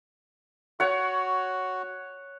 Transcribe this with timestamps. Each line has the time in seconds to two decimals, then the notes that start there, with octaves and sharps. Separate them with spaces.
0.80 F#4 C#5 F#5